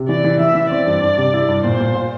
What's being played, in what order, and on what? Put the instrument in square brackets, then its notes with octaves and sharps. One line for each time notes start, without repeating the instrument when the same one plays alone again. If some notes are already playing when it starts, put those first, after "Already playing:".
Already playing: [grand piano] C3
[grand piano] E3 [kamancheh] D5
[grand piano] E3
[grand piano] E3 [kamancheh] E5
[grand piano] E3
[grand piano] C4 [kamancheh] D5
[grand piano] G2
D4
C3
E4
G2
[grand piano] A#2 [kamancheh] C5
[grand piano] A#2
F4